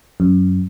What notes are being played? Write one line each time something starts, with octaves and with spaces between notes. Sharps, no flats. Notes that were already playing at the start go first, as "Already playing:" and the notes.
F#2